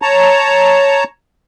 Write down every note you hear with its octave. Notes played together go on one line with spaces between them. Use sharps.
C#5 A5 A#5